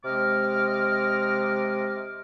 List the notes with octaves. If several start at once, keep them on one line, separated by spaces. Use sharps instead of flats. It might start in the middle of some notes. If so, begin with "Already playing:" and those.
C3 G#3 D#5 D6 F6